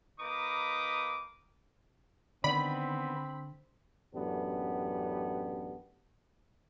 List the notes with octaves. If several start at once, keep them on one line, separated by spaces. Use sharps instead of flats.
A#3 D#4 B4 B5 D6 D#6
D3 D#3 B3 C4 D5 B5
A1 F#2 B3 D4 G4